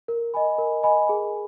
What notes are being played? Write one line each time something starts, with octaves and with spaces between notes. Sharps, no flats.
A#4
D#5 G#5 B5
A#4
D#5 G#5 B5
G#4